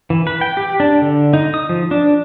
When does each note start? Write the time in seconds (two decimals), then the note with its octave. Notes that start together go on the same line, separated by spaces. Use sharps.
0.10 E3
0.27 B4
0.41 G5
0.57 G4
0.80 D4
1.02 D3
1.34 D#4
1.54 D#6
1.69 F3
1.91 D4